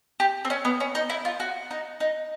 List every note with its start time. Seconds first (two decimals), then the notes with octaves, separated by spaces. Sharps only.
0.20 G4
0.45 C4
0.50 C#4
0.65 B3
0.80 C#4
0.95 D#4
1.10 E4
1.25 F4
1.40 F#4
1.71 D#4
2.00 D#4